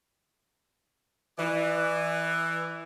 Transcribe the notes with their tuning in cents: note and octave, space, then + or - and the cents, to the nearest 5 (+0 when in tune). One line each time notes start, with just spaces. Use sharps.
E3 +5 D5 +35